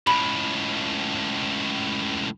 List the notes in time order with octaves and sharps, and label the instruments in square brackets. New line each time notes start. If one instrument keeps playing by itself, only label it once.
[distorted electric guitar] C#2 A2 [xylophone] B5